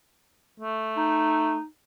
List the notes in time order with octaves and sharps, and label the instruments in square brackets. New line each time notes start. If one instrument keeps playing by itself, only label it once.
[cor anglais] A3
[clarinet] D#4